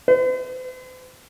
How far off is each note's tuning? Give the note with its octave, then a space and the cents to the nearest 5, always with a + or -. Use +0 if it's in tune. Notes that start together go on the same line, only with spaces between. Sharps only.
C5 -45